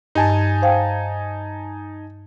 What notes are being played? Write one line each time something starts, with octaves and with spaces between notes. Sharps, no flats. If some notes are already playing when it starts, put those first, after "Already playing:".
G2 D#4 G#5 A5
C5 F5 G5